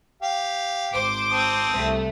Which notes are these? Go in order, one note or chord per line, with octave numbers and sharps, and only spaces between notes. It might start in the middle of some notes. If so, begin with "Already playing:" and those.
G4 F5
G#1 C5 D6
C4 A5 D#6
C2 A3